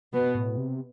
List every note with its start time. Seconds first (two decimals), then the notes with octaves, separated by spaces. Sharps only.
0.13 B2 B3
0.35 A2
0.57 C3